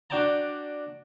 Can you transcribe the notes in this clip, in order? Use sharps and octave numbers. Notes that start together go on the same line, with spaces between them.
D4 F#4 D5 G5 A5 A#5